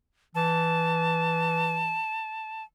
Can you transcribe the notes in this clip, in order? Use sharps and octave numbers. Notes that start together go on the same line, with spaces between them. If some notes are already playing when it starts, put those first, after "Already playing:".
E3 A5